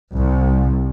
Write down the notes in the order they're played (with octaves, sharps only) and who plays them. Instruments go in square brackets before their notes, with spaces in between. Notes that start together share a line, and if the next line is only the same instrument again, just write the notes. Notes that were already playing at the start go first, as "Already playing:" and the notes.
[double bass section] C2